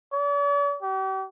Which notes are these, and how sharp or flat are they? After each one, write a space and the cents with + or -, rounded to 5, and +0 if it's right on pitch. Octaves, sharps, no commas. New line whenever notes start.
D5 -45
G4 -40